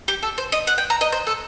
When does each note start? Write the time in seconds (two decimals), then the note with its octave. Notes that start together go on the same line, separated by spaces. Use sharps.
0.08 G4
0.23 A4
0.38 C5
0.52 D#5
0.67 F#5
0.78 G5
0.90 A#5
1.01 D#5
1.12 C5
1.27 A4